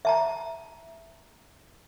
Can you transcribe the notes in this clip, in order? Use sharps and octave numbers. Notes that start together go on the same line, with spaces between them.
E5 A5 A#5